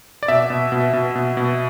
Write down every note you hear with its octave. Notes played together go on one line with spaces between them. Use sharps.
D5
B2 E5
B2
B2
B2
B2
B2